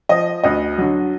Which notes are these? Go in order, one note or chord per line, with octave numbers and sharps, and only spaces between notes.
F3 D#5
D2 D#5
D3 F#3